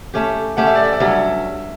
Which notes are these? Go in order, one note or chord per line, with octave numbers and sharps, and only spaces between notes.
A3 C#4 G4
A3 C#4 G4 F#5
E5
D5
E5
D5
G2 F#3 C#4 E5